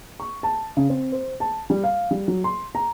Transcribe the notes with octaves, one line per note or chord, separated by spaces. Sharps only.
C#6
A5
C#3
C4
C5
A5
G3
F5
G3
F#3
C6
A#5